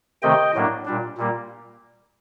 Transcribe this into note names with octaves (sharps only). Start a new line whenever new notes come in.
C3 D#3 A3 C4 D#5 G5
A2 F#3 A#3 D4
A#2 G3 D4
A#2 G3 A#3